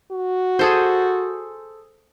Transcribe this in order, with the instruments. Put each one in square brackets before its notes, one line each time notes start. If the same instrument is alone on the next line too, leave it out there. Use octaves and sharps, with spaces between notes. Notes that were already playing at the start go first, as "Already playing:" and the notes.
[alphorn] F#4
[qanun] G#4 A4 C5